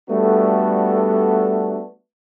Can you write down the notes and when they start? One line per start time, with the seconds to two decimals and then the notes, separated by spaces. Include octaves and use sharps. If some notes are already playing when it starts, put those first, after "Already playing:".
0.10 G3 A3 B3 D4 F#4 A4